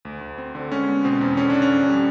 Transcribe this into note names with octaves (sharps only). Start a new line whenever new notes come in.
D2
D2
C4
D3
G#3 C#4
B3
B2 C4
E2
D3 C#4
D4
D3
C#4
F2
G3